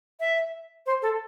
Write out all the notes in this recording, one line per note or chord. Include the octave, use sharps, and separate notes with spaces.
E5
C5
A4